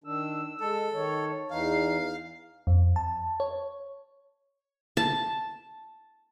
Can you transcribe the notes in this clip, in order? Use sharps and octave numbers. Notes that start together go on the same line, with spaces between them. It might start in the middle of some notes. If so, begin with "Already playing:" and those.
D#3 D4 E6
G#3 A4
D#3 C#5
E2 E3 D#4 F5 C7
F2
A5
C#5
A5